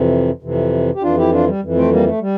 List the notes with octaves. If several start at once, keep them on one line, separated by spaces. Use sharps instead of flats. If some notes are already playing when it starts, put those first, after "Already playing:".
Already playing: F2 C3 E3
F2 C3 E3
G4
F2 E3 D4 F4
E4 G4
D4 F4
G3
F2 E3
A3 C4
G3 A#3
A3
G3